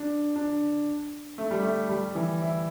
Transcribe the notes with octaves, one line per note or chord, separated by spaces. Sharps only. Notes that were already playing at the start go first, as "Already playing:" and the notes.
Already playing: D4
D4
A3
G3
A3
G3
E3
E4